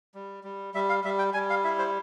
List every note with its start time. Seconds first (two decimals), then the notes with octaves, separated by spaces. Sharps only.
0.14 G3
0.44 G3
0.74 G3 E5
0.89 F5
1.04 G3 E5
1.19 G5
1.34 G3 G#5
1.50 F5
1.64 E4 E5
1.79 C5